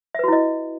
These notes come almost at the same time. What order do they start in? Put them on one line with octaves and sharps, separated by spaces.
E5 B4 F#4 E4 D#5